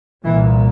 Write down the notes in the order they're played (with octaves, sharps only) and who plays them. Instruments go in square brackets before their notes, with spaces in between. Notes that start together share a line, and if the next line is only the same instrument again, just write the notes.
[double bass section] C2 A#2 E3